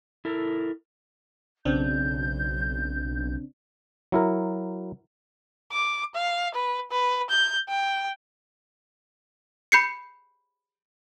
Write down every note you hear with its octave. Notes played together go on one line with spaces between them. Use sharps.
E4 A4 A#4
B1 C#3 C4 D4 G6
F#3 E4 A#4
D6
F5
B4
B4
G6
G5
B5 G6 C7 C#7